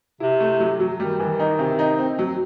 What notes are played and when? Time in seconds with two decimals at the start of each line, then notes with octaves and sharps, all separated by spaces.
0.20 C3 E4
0.40 A3
0.60 F#3
0.80 F#3
0.99 D#3 G3
1.20 E3
1.40 D#4
1.59 C3
1.79 D#4
1.99 C4
2.19 F#3